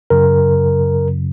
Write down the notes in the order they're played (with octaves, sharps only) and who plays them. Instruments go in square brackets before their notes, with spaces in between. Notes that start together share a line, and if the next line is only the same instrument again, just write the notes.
[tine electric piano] F#2 C#3 F#3 A#4